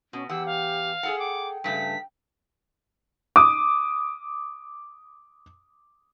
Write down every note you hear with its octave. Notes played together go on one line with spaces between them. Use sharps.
B2 C#4
E2 G4 F#5 E6
F5
G#4 A4 F#5
G5 D6
G2 C#3 A3 B6
D6 D#6